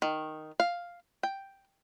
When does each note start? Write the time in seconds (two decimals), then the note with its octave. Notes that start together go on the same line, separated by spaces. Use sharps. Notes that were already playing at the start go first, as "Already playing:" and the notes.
0.02 D#3
0.60 F5
1.23 G5